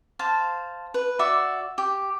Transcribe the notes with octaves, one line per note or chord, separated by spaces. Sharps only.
C5 F5 A5
B4
F#4 D5 E5
G4